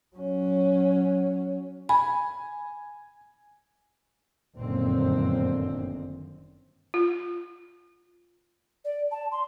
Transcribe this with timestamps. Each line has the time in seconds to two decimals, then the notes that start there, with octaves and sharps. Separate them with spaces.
0.17 F#3 C#4
1.89 G#5 B5
4.56 G1 F#2 A#2 D3 D#3 C4
6.94 F4
8.84 D5
9.11 A5
9.31 C6